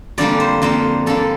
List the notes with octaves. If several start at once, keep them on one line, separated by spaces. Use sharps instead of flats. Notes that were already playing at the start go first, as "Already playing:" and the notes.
F2 D3 G3 A#3 D5
C5
F2 D3 G3 A#3 C5
F2 D3 G3 A#3 A4